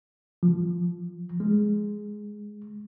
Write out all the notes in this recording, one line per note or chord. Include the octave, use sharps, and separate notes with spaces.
F3
G#3